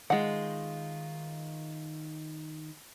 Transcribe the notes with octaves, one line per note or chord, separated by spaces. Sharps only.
D#3 G#3 F4 F#5